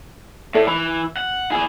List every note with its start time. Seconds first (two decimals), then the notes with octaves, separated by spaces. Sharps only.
0.55 A2 A4 D5 E5
0.67 E3 B5
1.17 F#5
1.51 E4 G#4